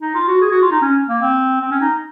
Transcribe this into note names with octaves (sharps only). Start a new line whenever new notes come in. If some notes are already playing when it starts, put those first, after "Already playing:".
D#4
F4
F#4
G#4
F#4
F4
D#4
C#4
A#3
C4
C4
C#4
D#4